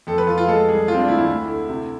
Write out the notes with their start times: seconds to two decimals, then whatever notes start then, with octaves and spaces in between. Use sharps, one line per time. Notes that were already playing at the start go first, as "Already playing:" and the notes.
0.07 F2 A4
0.18 B4
0.27 F2 F4
0.38 F4
0.47 G#3 A4
0.68 C2 G#4
0.88 G#3 F4
0.93 C4
0.98 D4
1.08 D2 E4
1.18 E4
1.28 D2
1.49 D3
1.69 C3